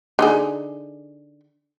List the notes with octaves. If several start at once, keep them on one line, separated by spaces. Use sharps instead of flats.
D3 D#4 G#4